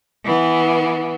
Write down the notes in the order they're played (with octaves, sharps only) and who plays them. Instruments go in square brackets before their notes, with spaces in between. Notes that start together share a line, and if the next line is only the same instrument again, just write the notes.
[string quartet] E3 B3